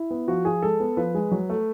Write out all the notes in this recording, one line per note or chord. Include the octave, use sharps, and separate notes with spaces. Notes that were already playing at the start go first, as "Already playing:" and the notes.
Already playing: E4
B3
F3 F#4
F3 G#4
G#3 A4
B3
F3 B4
G#3
F#3
A3